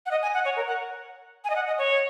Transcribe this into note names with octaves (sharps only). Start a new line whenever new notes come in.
F#5
D#5
G#5
F#5
C#5
A#4
F#5
G#5
D#5
F#5
D#5
C#5